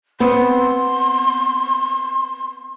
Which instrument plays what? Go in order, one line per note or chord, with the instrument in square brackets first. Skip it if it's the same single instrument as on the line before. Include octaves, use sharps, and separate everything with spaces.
[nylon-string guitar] B3 C4 [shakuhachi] C6